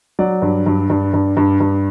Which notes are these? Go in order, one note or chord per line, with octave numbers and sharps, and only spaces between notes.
F#3 D5
G2
G2
G2
G2
G2
G2